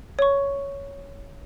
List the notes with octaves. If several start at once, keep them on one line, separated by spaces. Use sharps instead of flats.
C#5 C#6